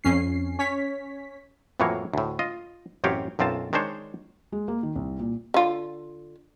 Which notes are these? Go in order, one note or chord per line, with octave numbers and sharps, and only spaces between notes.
F2 C#4 C7
C#4 C#5 B6
F2 A2 E3 F#3 A#3 C#5
D2 A2
F4 D#5
A1 F#2 C4 G4 C#5 F5
B1 F#2 C4 F4 A5
D#3 G#3 D4 C5 C#5
G#3
A#3
D#3
C2
A#2
D3 F4